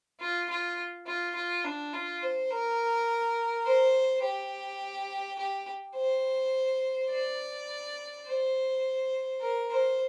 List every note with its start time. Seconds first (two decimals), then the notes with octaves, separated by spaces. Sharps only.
0.20 F4
0.49 F4
1.06 F4
1.35 F4
1.64 D4
1.93 F4
2.22 C5
2.50 A#4
3.66 C5
4.23 G4
5.39 G4
5.96 C5
7.11 D5
8.27 C5
9.41 A#4
9.71 C5